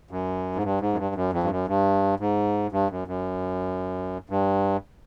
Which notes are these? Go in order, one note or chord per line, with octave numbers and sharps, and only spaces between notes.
F#2
G#2
G2
G#2
F#2
G2
F#2
F2
G2
F#2
G2
G#2
G2
F#2
F#2
G2